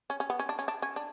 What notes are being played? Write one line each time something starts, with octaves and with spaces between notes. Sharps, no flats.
C#4
C#4
B3
C#4
D4
C#4
D4
C#4
D4